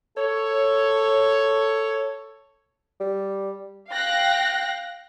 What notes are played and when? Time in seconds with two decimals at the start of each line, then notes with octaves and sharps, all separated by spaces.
0.16 A4 C#5
3.01 G3
3.90 F5 G5 F#6 A#6